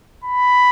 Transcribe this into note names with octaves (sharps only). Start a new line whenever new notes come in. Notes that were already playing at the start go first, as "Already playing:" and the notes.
B5